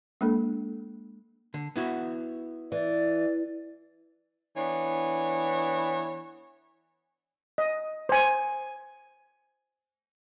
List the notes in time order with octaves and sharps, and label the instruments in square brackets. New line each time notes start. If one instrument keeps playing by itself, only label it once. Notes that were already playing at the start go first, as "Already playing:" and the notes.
[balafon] G#3 A#3 D4 A4
[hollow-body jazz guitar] D3
B3 E4 F#4
[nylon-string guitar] E3 [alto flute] D5
[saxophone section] E3 B3 D4 C#5
[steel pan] D#5
C5 G#5